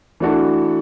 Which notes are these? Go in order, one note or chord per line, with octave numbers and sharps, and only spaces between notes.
E3 A3 D4 F#4 A4